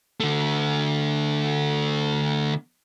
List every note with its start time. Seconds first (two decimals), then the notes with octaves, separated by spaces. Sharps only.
0.20 D3 A3